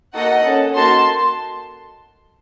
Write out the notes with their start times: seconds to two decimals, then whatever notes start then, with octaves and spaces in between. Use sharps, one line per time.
0.13 A#3 D#4 F#4 A4 D#5 F#5
0.44 C#4 A4
0.74 A#3 D#4 F#4 A4 A5 C6